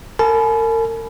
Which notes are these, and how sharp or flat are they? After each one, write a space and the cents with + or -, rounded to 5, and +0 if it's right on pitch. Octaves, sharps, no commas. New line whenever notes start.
A#4 -40 G#5 +45 B5 +0